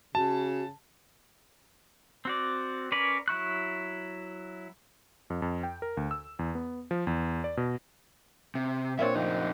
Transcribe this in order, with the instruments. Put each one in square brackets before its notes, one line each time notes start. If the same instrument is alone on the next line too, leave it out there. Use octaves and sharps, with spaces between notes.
[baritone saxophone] C#3 [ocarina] F#4 [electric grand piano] A5
[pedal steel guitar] C4 F#4 D5
C#4 A#4 B4 C#5 D5
F#3 E4 C#6 F#6
[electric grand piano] F2
F2
G5
A#4
D2
E6
E2
B3
F3
E2
D5
B2
[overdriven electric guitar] C3
[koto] A#2 C4 D4 [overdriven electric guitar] C#5 E5
[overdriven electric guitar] F2 D#4